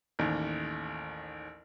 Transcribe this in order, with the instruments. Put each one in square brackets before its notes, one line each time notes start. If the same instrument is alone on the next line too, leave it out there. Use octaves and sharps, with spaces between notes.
[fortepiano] A1 D#2